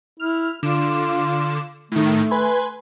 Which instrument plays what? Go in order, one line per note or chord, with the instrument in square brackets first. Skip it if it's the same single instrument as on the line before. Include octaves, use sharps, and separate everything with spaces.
[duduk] E4 [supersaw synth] F6
[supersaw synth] D3 D6 E7 [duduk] F4
[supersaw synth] A2 D#3 [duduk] A3
[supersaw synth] B4 G#5 C6